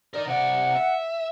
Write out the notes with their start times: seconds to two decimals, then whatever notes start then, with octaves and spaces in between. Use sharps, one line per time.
0.14 D#4 A#4 D5
0.27 C3 D5 F#5
0.75 E5